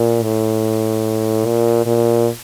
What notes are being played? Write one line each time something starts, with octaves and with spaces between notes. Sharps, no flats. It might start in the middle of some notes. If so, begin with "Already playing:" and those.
Already playing: A#2
A2
A#2
A#2